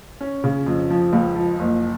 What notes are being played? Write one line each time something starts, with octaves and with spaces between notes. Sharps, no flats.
C#4
C#3
F2
F3
C#2
F3
F#1